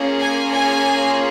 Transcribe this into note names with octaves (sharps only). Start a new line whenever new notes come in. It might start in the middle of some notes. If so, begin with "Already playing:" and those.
Already playing: A#3 C#4 F4 G#4
G#5
G#5